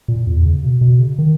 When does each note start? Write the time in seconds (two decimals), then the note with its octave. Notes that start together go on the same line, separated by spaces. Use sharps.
0.08 A#2
0.27 E2
0.45 C#3
0.64 B2
0.81 B2
0.99 C#3
1.19 D#3